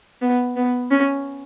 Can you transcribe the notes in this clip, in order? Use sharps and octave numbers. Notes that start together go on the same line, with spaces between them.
B3
B3
C#4